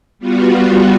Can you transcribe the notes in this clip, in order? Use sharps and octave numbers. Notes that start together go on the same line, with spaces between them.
G3 B3 F4 F#4